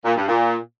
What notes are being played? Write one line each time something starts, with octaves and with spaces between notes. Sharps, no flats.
A#2
G2
A#2